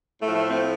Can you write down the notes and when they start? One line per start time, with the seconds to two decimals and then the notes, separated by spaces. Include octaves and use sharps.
0.21 A2 F3 A3
0.36 A3
0.50 C4